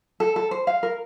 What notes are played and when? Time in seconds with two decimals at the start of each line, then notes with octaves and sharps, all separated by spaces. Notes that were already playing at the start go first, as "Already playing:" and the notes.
0.20 A4
0.36 A4
0.51 C5
0.67 F5
0.83 A#4